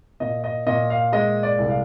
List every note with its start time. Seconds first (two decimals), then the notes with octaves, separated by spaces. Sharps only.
0.20 A#2 D#5
0.44 D#5
0.67 A#2 D#5
0.90 F5
1.12 G#3 D#5
1.43 D5
1.58 C2
1.70 F5